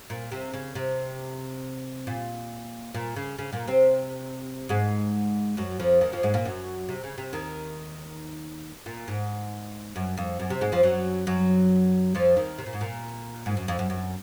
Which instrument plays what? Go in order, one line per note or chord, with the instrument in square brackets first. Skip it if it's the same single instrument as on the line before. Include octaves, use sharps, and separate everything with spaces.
[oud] A#2
C3
C#3
C3
A#2
A#2
C#3
C#3
A#2 A#3
C3 C4
G#2 G#3
F#2 F#3
F2 F3
D#2 D#3
F2 F3
G#2 G#3
A#2 A#3
F#2 F#3
C3
C#3
C3
D#2 D#3
A#2
G#2
F#2
F2
F#2
C3
G#2 G#3
F2 F3
F#2 F#3
F#2 F#3
F2 F3
D#2 D#3
C3
A#2
G#2
A#2
G#2
F#2
F2
F#2
F#2